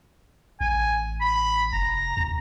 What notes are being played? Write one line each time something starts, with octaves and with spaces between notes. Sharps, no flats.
A1 G#5
B5
F1 A#5
D#2